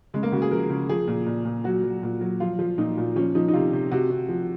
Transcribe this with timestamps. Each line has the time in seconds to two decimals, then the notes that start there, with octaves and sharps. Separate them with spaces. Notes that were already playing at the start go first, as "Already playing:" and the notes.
0.14 C#3 G#3
0.23 A#3
0.32 C#3 F#4
0.42 G#4
0.51 F3 A#4
0.70 C#3
0.89 F3 G#4
1.07 A#2
1.26 A#2
1.45 A#2
1.64 F#3 F#4
1.83 F#3
2.03 A#2
2.21 F#3
2.40 F3 F4
2.59 F3
2.78 A#2 D#4
2.98 A#2
3.16 F3 C#4
3.35 F3 D#4
3.48 D#4
3.53 C3 F4
3.73 C3
3.92 C3 F#4
4.10 C3
4.29 F3